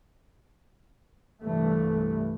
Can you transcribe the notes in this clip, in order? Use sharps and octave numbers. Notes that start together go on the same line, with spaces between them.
C2 G2 E3 A3